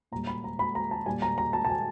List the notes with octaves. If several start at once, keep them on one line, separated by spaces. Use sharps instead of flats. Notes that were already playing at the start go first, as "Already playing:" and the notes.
A#2 G3 A#5
B5
A#5
B5
A#5
A5
A#2 G3 G#5
A#5
A#5
A5
A5
G#5